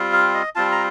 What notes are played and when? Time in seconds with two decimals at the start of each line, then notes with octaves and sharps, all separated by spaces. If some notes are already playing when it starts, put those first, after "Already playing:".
Already playing: G3 C4 F4
0.13 F5
0.34 D#5
0.55 G3 C4 F4 A5
0.72 A#5